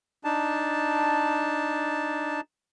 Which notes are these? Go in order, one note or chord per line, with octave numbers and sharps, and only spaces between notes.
D4 D#4 A5